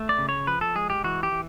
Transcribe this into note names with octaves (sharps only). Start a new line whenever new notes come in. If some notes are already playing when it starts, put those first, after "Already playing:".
Already playing: A3
D5
C#3
C#5
F3 B4
A4
G#3 G#4
G4
E3 F#4
G4
E3